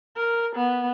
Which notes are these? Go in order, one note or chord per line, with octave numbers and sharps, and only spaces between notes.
A#4
B3